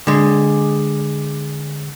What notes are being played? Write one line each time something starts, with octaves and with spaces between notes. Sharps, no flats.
D3 G#3